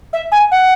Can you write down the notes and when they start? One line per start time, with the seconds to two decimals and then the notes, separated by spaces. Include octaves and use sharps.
0.13 E5
0.31 G#5
0.51 F#5